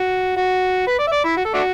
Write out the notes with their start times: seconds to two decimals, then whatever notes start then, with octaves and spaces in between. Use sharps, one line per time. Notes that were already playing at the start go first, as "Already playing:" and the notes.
Already playing: F#4
0.37 F#4
0.87 B4
0.99 D5
1.07 E5
1.12 D5
1.24 E4
1.37 F#4
1.45 A4
1.54 A3 D4 F#4